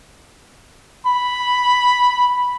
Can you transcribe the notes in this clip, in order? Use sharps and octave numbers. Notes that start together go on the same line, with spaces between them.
B5